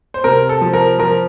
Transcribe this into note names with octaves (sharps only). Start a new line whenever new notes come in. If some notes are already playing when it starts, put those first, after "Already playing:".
C5
C3 A#4
A4
F3
A#4
F3 A#4